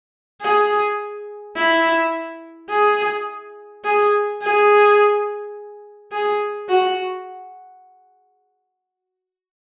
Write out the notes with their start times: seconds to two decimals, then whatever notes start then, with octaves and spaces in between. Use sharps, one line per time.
0.41 G#4
1.56 E4
2.70 G#4
3.84 G#4
4.41 G#4
6.12 G#4
6.69 F#4